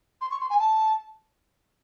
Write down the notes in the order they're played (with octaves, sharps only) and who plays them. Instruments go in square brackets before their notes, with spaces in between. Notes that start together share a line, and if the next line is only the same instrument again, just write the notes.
[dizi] C6
C#6
C6
G#5
A5